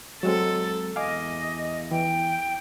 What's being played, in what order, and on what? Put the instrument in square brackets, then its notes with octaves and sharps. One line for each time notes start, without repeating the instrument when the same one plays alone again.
[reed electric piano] F#3 G#3 C4 [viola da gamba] A4
[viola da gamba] E2 [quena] D#5 [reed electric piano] F5 G#5 D6
[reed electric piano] E3 [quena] G5